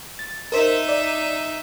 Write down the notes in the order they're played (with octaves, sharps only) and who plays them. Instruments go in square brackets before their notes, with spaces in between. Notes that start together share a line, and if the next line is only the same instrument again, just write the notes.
[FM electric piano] A6
[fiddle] D#4 E5 [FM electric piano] A#4 C5
[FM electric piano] D5